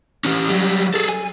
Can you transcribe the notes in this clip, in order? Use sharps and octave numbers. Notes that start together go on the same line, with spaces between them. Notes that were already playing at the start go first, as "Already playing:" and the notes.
E3 C#4
F#3 G3
G#4 A4
G#5